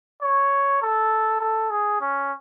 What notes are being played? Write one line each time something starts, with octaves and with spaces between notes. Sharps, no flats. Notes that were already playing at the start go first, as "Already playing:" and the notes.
C#5
A4
A4
G#4
C#4